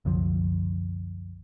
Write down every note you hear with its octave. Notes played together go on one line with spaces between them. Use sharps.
C2 F#2 D3 F3